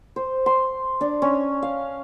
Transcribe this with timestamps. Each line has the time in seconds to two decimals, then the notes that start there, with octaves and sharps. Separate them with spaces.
0.16 C5
0.46 C6
1.01 D4
1.22 C#4
1.62 F5